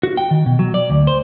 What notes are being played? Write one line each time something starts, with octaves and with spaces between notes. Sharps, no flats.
F#4
G5
D#3
B2
F#3
D5
D2
C5